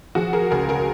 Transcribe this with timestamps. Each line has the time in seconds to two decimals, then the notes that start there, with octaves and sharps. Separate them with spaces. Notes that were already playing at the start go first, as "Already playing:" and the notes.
0.15 F3 F#4 G#4
0.33 G#4 A#4
0.51 C#2 G#4 A#4
0.69 G#4 A#4